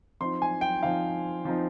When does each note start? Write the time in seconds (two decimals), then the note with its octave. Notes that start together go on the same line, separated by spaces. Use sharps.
0.21 F3 C4 D#4 C6
0.42 G#5
0.61 G5
0.82 F3 C4 D#4 F5
1.45 F3 C4 D#4